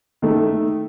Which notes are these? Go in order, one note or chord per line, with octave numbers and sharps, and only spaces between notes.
D#3 A3